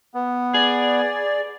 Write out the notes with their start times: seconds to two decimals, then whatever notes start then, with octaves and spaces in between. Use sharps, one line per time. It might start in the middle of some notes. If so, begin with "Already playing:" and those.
0.14 B3
0.54 G#4 D5